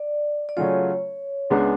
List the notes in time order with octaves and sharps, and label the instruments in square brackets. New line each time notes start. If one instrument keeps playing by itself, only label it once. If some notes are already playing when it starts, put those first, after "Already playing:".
Already playing: [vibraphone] D5
D5
[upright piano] C#3 F#3 A3 C#4 F4 [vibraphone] C#5
[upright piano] C#2 C#3 G#3 B3 D4